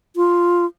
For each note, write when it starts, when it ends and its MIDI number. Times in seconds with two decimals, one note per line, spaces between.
0.16 0.65 65